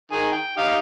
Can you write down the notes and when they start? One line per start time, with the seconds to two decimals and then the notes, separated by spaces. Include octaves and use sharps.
0.12 D#3 G#4
0.32 G5
0.57 D#4 G4 F5